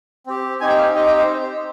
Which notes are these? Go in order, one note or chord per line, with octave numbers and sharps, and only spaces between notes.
C4 G4
C4 D#4 G4 G#5
G5
F5
C4 D#4 G4 D#5
G5
C5